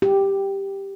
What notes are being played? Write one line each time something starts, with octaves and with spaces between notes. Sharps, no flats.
G4